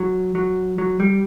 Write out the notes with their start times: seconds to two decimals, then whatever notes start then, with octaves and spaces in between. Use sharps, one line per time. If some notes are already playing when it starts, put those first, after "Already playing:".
Already playing: F#3
0.35 F#3
0.78 F#3
1.00 G3